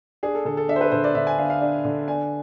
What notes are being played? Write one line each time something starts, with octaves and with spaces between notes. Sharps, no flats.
D4 G#4
A4
D3 A4
A4
D4 E5
C5
B4
D3 C5
D5
D3 E5
G#5
D3 F5
F5
D4
D3
D4 G#5